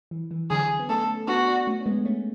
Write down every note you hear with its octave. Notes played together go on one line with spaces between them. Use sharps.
E3
E3
D3 F#3 G#4
B3
A3 C#4 A4
B3 D4 F#4
A3 C#4
C#4
G#3 B3
A3 C#4